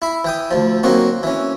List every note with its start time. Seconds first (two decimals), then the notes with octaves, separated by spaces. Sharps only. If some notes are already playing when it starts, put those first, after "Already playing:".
0.02 E4 B5
0.24 E3 G5 D#6
0.51 D2 F3
0.83 F#3 A#3 C4 D#4 F#4
1.23 E3 C#4